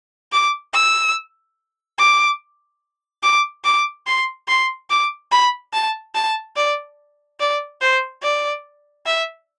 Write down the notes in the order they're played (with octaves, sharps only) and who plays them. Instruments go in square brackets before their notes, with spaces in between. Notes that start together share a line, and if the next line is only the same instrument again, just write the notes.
[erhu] D6
E6
D6
D6
D6
C6
C6
D6
B5
A5
A5
D5
D5
C5
D5
E5